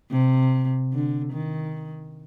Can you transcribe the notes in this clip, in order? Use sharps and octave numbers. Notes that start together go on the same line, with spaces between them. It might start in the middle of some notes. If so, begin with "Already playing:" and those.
C3
D3
D#3